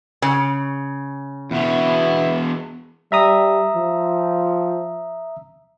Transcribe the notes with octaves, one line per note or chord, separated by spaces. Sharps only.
C#3
E2 B2 B3 E4
G3 E5 A#5 D#6
F3